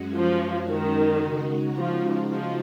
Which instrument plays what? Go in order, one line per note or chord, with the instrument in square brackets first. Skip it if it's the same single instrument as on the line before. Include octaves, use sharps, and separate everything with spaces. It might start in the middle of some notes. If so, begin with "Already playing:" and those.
Already playing: [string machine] F#2 G#3 C#4 F#4
[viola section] F3
D#3
[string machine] C#3 G#3 D#4 F#4
[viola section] F3
F3